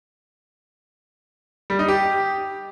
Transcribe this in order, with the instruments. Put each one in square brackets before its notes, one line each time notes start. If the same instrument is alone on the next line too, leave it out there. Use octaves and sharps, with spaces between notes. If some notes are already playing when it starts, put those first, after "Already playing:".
[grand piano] G3
D#4
G4